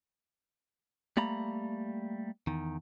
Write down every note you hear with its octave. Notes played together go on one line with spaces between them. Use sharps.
G3 A3 A#3 A#5 B5
E2 D#3